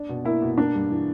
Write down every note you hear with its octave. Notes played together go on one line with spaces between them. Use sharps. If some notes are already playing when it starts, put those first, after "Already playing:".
Already playing: D4
B2
A#3 E4
B2
A#3 D4
G2
E3